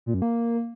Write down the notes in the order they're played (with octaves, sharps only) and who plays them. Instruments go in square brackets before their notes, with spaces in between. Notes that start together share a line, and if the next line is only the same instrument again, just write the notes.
[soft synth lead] A#2
F#2
A#3